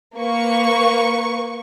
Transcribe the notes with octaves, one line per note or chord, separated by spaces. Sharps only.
A#3 B4 C#6